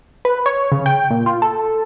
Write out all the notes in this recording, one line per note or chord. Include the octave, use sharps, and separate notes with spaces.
B4
C#5
C#3
G5
A#2
F4
A4